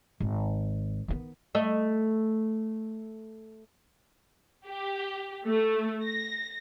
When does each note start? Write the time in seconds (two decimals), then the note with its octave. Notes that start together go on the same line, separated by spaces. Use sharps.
0.20 G#1
1.08 D#3 B3
1.55 A3 D#5
4.66 G4
5.45 A3
6.05 A#6